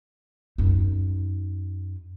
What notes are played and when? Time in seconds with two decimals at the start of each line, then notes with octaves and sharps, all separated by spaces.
0.58 F#2 D#4